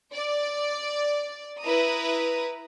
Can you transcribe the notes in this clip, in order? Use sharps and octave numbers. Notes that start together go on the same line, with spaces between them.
D5
E4 B4 A#5 D#6